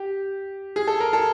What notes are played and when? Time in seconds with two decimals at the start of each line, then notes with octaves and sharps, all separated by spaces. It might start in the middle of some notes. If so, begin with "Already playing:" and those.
Already playing: G4
0.76 G#4
0.87 A4
1.00 A#4
1.13 A4